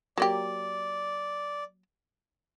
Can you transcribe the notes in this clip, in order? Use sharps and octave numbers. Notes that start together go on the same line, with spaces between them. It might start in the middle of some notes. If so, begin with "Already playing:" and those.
F#3 A#3 G4 D5